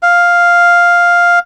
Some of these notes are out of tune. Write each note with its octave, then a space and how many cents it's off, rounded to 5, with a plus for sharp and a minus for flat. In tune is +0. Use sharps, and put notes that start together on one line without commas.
F5 +0